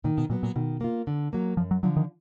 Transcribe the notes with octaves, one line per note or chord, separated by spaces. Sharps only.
A#2 D#3
B2
A#2 F#3 B3
A#2
B2 D#3
A#3 F4
D3
F#3 A#3
F#2 F3
F#3
D3 F3 F#3
D#3